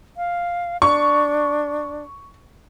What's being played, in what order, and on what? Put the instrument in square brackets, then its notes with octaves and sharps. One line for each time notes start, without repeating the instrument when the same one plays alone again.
[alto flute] F5
[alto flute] D4 [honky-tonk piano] C#6